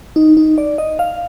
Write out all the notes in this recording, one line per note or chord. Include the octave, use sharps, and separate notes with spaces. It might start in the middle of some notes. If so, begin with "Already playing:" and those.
D#4
D#4
D5
D#5
F5